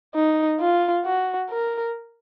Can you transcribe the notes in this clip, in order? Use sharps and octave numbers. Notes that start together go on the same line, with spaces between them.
D#4
F4
F#4
A#4